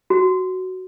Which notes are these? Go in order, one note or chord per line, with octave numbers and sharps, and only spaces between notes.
F#4